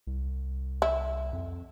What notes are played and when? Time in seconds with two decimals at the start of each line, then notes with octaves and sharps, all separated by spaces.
0.07 C2
0.82 E4
1.33 F2